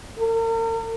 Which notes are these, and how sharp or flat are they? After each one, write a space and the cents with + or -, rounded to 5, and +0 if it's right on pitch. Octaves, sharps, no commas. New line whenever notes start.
A#4 -40